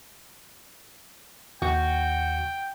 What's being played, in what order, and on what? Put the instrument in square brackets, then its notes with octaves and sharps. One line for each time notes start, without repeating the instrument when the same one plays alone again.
[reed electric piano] D#2 [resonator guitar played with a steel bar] F#4 [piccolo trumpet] G5